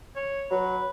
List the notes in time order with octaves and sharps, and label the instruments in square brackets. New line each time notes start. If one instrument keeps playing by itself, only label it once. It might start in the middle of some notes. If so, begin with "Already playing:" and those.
[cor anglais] C#5
[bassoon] F#3 [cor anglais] B4